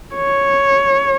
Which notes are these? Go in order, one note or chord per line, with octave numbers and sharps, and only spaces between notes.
C#5